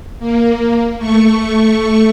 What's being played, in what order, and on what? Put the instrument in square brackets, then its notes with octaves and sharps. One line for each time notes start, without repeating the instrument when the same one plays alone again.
[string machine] A#3
A3 C#6